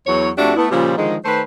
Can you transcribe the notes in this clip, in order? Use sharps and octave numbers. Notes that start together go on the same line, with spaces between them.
E2 F#3 C#5
F2 A3 D4 F#4 G4 E5
A3 B3 E4
A#2 C#3 F3 G3
D3 D#3 F3 G#3
D#3 A3 B4 C5